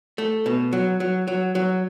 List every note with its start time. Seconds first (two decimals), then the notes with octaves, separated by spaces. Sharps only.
0.18 A3
0.46 B2
0.73 F#3
1.00 F#3
1.28 F#3
1.55 F#3